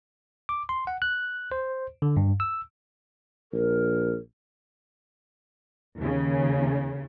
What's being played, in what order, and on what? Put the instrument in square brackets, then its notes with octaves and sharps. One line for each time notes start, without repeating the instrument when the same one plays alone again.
[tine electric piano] D6
C6
F#5
F#6
C5
D3
G2
E6
[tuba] A#1 [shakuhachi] A#4
[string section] D#2 C#3